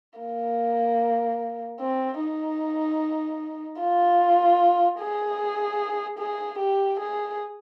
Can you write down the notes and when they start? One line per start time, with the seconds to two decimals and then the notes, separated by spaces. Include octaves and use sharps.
0.20 A#3
1.81 C4
2.20 D#4
3.80 F4
5.00 G#4
6.19 G#4
6.59 G4
7.00 G#4